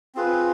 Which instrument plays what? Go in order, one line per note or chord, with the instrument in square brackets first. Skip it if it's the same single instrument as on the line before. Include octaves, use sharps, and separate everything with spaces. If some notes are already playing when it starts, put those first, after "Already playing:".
[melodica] C4 F4 G#4 B4